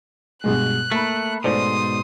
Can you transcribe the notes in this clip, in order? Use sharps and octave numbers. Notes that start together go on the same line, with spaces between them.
G2 B2 G#3 F#6
A3 A#3 B5
G#2 B2 A3 C5 D5 C6 D#6